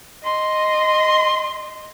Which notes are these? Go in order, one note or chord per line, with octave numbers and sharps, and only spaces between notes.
D#5 C6